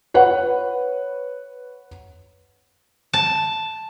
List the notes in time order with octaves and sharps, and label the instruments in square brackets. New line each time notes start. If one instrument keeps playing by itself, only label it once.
[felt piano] B4 C#5 F#5
[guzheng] A5